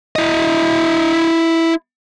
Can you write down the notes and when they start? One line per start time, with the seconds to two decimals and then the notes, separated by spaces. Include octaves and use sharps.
0.16 E4 D#5